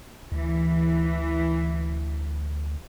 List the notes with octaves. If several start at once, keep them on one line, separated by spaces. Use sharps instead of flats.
D2 E3